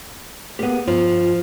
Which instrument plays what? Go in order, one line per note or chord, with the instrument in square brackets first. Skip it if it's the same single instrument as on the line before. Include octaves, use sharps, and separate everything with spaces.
[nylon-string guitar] A#3 B3 [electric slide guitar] G4 G#4
[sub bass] G2 [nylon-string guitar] F3 [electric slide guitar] F4